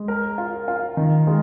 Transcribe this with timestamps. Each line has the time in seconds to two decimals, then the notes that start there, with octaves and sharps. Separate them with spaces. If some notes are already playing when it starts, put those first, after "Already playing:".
Already playing: G#3
0.08 A#4
0.38 F4
0.68 F4
0.97 D#3
1.27 G#3